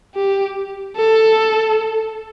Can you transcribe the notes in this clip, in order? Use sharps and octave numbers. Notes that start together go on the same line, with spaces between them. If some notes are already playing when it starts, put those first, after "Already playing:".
G4
A4